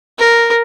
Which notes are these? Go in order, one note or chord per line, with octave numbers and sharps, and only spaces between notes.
A#4